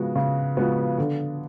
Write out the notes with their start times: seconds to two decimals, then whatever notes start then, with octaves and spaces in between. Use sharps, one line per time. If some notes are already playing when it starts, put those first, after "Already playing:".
Already playing: C#3 F3 G#3 B3 F#4
0.16 C#3
0.57 F3 G#3 B3 F#4
0.98 D3